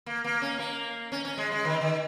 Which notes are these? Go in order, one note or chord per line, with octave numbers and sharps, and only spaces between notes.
A#3
A#3
C#4
A#3
C#4
C#4
G#3
G#3
D#3
D#3